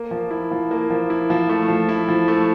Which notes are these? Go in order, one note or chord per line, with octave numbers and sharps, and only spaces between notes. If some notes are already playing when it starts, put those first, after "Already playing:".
Already playing: A#3
F3
E4
F3
A#3
F3
E4
F3
A3
F3
E4
F3
A3